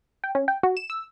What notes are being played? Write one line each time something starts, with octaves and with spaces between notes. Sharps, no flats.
G5
C#4
G5
F#4
E7
E6